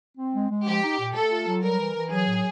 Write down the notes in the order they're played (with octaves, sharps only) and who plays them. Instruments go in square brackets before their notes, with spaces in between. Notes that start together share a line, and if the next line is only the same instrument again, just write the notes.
[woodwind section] C4
G#3
G#3
[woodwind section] F3 [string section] G4
[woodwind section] D#4
A#2
[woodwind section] A3 [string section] A4
[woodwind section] F4
F#3
[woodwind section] G3 [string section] A#4
[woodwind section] E3
E3
[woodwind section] F#3 [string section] G#4
[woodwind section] A2